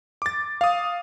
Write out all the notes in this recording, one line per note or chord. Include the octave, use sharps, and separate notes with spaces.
D6 A6
F5 D#6